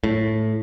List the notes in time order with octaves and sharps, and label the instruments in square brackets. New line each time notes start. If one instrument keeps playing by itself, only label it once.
[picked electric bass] A2